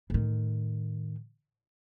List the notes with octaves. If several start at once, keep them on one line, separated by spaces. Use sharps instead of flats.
A2 D#3